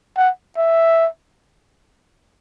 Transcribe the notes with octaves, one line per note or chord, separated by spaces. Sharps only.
F#5
E5